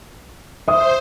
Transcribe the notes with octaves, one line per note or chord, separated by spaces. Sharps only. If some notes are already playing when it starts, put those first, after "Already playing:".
C5 E5 D#6